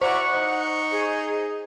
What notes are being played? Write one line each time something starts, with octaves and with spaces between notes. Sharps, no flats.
E4 F#4 C5 D5 F#5 C#6
D#4
G#4